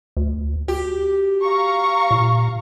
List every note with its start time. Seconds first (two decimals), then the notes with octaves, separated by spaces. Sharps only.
0.17 D2
0.68 F#4 G4
1.42 F5 A#5 C#6
2.11 A#2